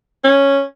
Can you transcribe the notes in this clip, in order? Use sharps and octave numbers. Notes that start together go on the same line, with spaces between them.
C#4